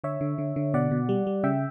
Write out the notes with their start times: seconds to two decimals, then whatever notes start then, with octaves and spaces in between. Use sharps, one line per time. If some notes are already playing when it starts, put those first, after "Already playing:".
0.04 D3 C#5 E5
0.21 D3
0.38 D3
0.56 D3
0.74 B2 D5 F#5
0.91 B2
1.09 G3
1.27 G3
1.43 C#3 E5 G5